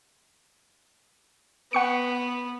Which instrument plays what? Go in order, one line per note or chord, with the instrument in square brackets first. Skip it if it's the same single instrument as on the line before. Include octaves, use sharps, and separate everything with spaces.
[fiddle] B3 [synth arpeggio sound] F#5 C#6 C#7